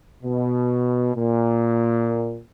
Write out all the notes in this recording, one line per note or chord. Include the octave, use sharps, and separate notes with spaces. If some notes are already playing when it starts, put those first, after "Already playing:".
B2
A#2